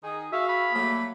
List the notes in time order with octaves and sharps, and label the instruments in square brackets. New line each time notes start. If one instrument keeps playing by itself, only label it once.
[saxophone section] D#3 D#4 G#4
[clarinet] F#4 [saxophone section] G#4 F5 [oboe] E5
[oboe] B5
[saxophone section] F#3 G3 A3 [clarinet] A#3